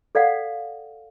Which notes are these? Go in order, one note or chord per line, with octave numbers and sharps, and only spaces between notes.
A4 D5 F5 F#5